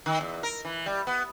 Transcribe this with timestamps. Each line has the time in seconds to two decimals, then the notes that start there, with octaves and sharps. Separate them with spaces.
0.06 D#3
0.21 E2
0.43 A#4
0.65 E3
0.86 G3
1.07 B3